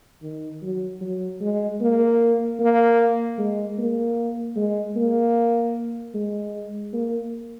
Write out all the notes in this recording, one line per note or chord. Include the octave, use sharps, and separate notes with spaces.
D#3
F#3
F#3
G#3
A#3
A#3
G#3
A#3
G#3
A#3
G#3
A#3